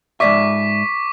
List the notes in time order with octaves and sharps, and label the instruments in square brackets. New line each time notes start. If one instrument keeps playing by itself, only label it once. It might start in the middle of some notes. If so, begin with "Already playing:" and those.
[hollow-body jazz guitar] G#2 D5 E5 [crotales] C#6 D6 B6